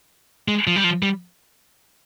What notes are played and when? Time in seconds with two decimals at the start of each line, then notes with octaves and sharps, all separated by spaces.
0.48 G#3
0.67 F3
0.76 G3
0.84 F3
1.03 G3